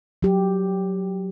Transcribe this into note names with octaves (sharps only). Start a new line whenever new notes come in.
F#3 G4